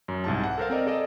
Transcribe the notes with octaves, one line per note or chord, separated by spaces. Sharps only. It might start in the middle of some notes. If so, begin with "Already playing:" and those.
F#2
C2 G#2 A5
F#5
A4 A#4 C5 F5
C4 A#4 D5 D#5
G#4 A4 D5 D#5